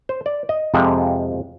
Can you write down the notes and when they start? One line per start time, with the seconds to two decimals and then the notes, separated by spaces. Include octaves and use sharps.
0.09 C5
0.26 D5
0.49 D#5
0.74 F2 C3 F3 G#3